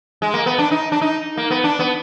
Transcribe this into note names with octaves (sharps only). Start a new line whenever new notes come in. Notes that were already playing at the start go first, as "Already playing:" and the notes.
G#3
A#3
B3
D4
D#4
D4
D#4
A#3
B3
D4
B3